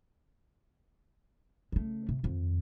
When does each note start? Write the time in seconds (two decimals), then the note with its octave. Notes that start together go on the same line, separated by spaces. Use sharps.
1.72 C#3 A3
2.09 C3
2.23 F2 D#3